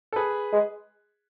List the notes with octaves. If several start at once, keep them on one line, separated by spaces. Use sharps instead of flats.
A4
G#4 B4
G#3